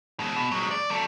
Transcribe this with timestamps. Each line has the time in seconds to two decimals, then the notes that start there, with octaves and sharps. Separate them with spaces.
0.20 B2 G#3
0.37 B2
0.51 F#3 G#3
0.71 D5
0.90 F#3 A4